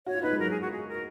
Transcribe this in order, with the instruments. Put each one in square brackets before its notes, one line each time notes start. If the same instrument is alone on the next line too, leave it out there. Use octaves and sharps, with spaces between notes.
[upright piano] F#4 [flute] C#5
[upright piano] F4
[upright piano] D#4 [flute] B4
[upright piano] G#3
[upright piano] F#3 [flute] A#4
[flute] G#4
F#4
G#4
A#4